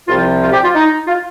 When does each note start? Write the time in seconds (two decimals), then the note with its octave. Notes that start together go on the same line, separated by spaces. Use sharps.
0.08 C2 C3 F3 F4
0.42 F4
0.52 G4
0.63 F4
0.75 D#4
1.07 F4